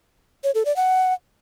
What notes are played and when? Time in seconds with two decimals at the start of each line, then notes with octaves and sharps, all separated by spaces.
0.44 C#5
0.55 A4
0.65 D5
0.76 F#5